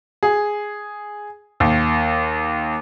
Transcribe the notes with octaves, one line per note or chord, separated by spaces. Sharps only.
G#4
D#2